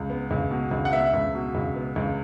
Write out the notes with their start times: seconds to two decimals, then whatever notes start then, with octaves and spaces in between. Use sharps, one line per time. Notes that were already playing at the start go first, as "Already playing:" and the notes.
Already playing: C#2
0.10 B3
0.31 C#2
0.51 B2
0.71 C#2
0.85 F#5
0.93 B3 E5
1.14 C#2
1.34 B2
1.55 C#2
1.76 B3
1.96 C#2